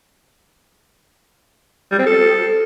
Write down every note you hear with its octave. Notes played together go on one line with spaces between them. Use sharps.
G3
C4
A4